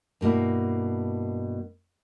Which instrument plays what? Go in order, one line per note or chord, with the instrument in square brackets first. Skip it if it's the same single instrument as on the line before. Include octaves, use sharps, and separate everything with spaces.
[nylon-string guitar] G2 B2 A#3 E4